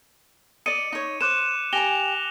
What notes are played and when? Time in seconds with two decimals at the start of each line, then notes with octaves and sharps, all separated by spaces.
0.66 D5 D#5 C#7 D#7
0.92 D#4 C#5
1.21 C5 D6 F#6 E7
1.73 G4 G#5 A#5 A#6 F7 G7